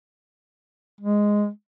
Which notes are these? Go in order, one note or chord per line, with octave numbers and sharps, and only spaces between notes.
G#3